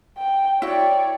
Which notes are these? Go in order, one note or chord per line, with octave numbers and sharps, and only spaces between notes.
G5
E4 F#4 C#5 D5 G5